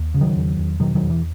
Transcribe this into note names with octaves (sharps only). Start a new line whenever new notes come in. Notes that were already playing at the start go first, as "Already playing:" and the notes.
Already playing: D#2
C#3
D#3 F#3
E2
E2
B2 D#3 F#3
D#3 F#3
E2
E3